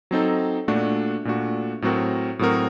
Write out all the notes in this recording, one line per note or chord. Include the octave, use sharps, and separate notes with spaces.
F#3 C4 D#4 A4
A#2 A3 D4 F#4
A#2 A3 D4 F#4
A2 F#3 C4 F#4 A#4
A2 F#3 C4 F#4 A#4